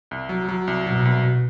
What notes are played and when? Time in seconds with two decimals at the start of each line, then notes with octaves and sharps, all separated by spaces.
0.11 C2
0.29 F#3
0.49 F#3
0.67 C2
0.87 B2 F#3
1.05 C2